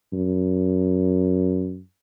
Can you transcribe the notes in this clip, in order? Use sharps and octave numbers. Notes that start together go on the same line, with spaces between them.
F#2